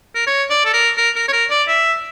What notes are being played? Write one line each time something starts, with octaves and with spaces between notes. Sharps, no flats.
A#4
C#5
D5
A4
A#4
A#4
A#4
C#5
A#4
D5
E5